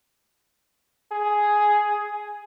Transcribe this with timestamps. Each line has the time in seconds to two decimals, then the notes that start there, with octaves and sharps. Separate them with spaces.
1.12 G#4